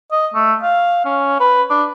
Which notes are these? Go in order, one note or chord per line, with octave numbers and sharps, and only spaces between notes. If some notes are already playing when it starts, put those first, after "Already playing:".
D#5
A3
F5
C#4
B4
D4